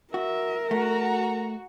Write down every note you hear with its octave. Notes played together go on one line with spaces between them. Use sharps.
F#4 A#4 E5
A3 F#4 A#5